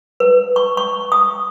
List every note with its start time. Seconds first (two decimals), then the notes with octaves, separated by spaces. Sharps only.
0.20 B4
0.56 C#6
0.77 C#6
1.12 D#6